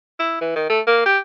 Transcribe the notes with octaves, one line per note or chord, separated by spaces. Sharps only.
E4
E3
D#3
A3
A#3
G4